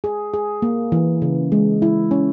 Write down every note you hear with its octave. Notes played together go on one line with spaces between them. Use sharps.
G#4
G#4
A#3
E3
C#3
G#3
E4
C#4